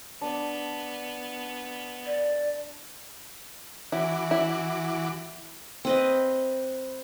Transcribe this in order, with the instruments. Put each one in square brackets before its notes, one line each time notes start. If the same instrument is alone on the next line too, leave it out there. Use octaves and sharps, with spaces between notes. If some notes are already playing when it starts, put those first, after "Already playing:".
[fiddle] B3 [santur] D4
[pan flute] D5
[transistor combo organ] E3 F#4 D6 [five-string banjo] E4
[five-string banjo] E4
[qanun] C4 B4 D#5